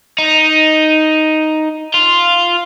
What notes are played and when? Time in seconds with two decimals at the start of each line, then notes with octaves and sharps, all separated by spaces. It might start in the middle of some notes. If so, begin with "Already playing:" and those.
0.18 D#4
1.94 F4